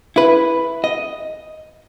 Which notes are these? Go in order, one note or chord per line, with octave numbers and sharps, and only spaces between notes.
E4 B4
D#5